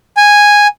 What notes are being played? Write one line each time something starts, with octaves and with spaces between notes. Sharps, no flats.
G#5